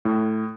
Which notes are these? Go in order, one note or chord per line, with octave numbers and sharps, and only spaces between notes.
A2